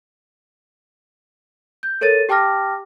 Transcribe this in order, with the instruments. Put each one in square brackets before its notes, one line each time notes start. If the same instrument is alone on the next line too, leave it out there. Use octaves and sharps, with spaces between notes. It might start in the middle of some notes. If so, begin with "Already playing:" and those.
[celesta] G6
A4 A#4 C#5 A6 D#7
G4 G5 A5 D6 F6 A#6